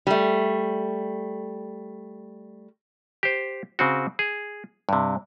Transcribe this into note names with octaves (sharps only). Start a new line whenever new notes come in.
G3 A3
G4 C5
C#3 C4 F#4
G#4
G2 C3